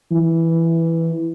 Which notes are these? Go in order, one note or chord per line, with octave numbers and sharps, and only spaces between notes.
E3